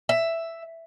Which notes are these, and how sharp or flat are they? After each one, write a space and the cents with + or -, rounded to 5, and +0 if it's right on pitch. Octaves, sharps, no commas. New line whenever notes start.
E5 +5